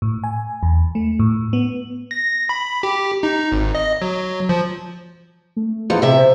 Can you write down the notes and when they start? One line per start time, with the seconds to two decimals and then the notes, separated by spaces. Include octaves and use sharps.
0.02 A2
0.24 G#5
0.63 E2
0.95 A3
1.19 A2
1.53 B3
2.11 A#6
2.49 B5
2.83 G4
3.23 D#4
3.52 G#1
3.75 D#5
4.02 F#3
4.49 F3
5.56 A3
5.90 E2 F3 G#4
6.02 C3 E5
6.18 C5